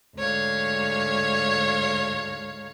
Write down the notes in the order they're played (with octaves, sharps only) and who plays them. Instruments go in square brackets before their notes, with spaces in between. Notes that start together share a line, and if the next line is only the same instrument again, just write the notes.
[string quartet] D2 G#2 C#5 F5